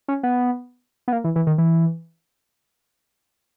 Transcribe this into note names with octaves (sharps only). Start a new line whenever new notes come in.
C#4
B3
B3
A#3
E3
E3
D#3
E3